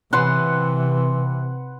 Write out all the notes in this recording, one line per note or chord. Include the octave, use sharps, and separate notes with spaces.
C3 E3 B4 F#5 C6